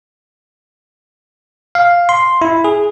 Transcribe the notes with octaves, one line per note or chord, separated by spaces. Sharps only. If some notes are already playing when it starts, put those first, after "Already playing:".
F5
C6
E4
G#4